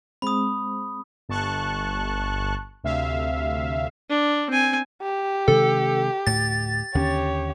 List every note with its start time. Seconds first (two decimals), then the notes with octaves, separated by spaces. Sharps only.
0.22 G#3 C4 B5 D#6
1.29 G1 A5 C#6 F#6
2.84 D2 C3 E5 F5
4.10 D4
4.50 C4 G#5
5.02 G4
5.48 C3 D#3 G#3 A4
6.27 D2 A2 A6
6.95 D#2 D3 C#4 G4 C#5